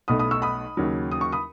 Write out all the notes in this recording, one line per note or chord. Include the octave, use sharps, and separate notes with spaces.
B1 B2 A3 B5 D#6
B5 D#6
C#6 E6
B5 D#6
D#2 C#3 F#3
D#6
C#6
B5 D#6